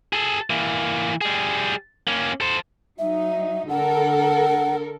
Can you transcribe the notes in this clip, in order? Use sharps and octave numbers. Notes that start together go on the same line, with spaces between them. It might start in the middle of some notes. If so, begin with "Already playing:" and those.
G#4 A4
E3 A#3
G3 G#4
A#3 C#4
A4 C5
F#3 D#4 E5
D3 A4 A#4 F#5